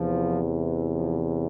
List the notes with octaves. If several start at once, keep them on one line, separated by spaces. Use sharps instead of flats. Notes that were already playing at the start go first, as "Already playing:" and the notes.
Already playing: E2 C3 E3 F3
E3
F3